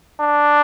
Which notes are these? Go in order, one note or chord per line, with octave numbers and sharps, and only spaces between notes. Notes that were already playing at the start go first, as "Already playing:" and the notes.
D4